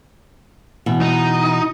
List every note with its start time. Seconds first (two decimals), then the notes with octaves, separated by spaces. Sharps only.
0.86 B2 E3
1.01 D#4